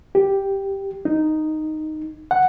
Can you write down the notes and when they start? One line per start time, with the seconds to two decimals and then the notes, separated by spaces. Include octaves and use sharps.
0.15 G4
1.05 D#4
2.31 F#5